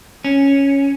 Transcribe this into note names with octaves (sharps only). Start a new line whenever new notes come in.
C#4